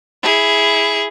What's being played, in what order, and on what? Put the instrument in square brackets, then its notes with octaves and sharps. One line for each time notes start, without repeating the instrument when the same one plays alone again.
[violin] E4 G#4